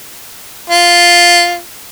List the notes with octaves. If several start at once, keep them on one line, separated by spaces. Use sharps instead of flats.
F4